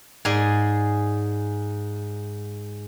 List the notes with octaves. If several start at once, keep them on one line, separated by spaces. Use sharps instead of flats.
G#2 G#4 D5 G#5